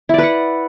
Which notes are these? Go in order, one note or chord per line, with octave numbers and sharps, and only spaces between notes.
E4 B4 D5 F#5